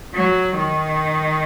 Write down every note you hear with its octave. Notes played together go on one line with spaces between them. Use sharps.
F#3
D#3